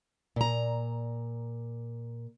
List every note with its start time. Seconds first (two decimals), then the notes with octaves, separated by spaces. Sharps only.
0.36 A#2 A#5